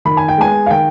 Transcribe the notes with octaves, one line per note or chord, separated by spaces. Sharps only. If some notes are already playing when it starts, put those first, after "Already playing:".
D#3 B5
G#5
G5
G#3 B3 G#5
F5
D#3 G5